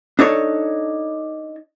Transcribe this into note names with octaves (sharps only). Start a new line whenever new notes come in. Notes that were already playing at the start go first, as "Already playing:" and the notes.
D4 D#4 A4 C#5